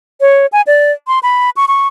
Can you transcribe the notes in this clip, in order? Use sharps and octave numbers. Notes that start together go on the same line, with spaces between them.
C#5
G#5
D5
C6
B5
C#6
C#6